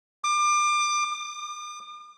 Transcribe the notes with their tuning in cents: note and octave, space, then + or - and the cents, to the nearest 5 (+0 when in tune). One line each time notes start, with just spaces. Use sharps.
D6 +30
D6 +45